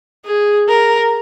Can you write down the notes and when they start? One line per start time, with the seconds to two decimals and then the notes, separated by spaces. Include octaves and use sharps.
0.25 G#4
0.68 A#4